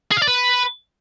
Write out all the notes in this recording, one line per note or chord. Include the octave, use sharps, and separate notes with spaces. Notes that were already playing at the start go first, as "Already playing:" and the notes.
G#4
F5
D5
B4